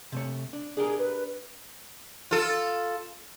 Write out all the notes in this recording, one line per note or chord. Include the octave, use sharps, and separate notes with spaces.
C3 A3 C#5
D4
D4 G4 G#4 A#4
B4
F4 A4